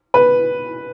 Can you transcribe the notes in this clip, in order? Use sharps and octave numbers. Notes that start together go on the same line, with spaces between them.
B4